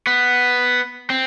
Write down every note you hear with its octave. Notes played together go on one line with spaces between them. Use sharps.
B3
C4